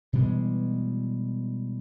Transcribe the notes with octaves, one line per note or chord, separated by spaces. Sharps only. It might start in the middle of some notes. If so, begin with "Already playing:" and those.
B2 E3 G3 G#3